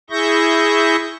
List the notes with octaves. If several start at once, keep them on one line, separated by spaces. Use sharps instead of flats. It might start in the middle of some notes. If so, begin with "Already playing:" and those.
E4 G#4 E5 C#6 G6 A#6